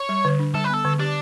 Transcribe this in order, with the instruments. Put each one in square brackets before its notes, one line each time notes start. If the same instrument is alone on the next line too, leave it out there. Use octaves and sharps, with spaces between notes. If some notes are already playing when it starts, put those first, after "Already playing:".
Already playing: [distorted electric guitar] C#5
[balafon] G3
D3
D4
[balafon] G3 [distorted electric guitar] A4
[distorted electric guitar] B4
[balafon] B3 [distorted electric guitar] A4
[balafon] D3
[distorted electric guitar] D4 [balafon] G4